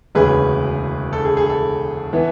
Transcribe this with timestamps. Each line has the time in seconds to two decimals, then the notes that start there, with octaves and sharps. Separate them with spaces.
0.15 E1 D2 C#3 G#4 B4
1.13 A4
1.25 G#4
1.37 G#4
1.49 A4
2.13 E3 B3